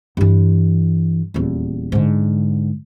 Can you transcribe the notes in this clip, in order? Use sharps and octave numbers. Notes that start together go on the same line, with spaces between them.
G2 E3
D#1 E2
G#2 D3